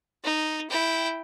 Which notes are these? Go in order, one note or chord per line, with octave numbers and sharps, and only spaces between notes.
D#4
E4 G5